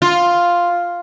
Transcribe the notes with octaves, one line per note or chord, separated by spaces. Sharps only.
F4